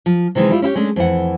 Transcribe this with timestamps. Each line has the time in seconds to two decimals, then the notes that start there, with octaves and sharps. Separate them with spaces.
0.06 F3
0.35 C3 D#3 E3 G#3
0.50 G3 E4 F4
0.62 C#4 E4 G4 C#5
0.75 G#3 A3 C#4 D4
0.96 F2 E3 F#5